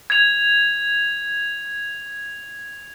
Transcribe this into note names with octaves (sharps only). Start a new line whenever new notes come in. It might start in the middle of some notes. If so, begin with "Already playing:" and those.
G#6 F7